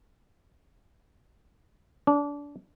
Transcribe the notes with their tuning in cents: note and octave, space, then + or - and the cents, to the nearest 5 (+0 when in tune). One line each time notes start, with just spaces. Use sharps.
D4 -25